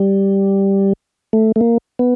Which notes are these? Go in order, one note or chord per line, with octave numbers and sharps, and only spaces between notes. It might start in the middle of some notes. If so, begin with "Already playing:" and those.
Already playing: G3
A3
A3
A#3
B3